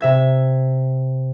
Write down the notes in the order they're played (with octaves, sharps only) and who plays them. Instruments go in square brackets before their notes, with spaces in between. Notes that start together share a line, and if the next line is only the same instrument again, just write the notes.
[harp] C3 E5 G#6